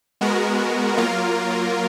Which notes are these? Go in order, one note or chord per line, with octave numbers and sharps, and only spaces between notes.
G#3 B3 F#4 A#4
F#3 A#3 F4 A#4